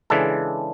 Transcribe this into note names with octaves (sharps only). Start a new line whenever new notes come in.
C#3 E3 G#3 D4 A4